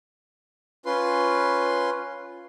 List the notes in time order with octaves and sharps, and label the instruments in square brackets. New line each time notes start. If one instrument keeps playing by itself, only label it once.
[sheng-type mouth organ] C#4 F4 B4 C6